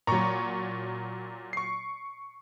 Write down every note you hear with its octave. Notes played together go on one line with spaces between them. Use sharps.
A#2 F#3 A#5 C#6
C#6 C7